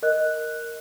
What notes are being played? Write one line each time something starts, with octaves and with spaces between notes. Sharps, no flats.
A#4 D#5 F#6